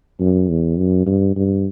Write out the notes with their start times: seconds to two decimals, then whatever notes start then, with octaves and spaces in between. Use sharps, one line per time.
0.20 F#2
0.49 E2
0.78 F#2
1.06 G2
1.37 G2